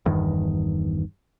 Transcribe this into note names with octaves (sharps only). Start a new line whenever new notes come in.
G1 E2 G2 D#3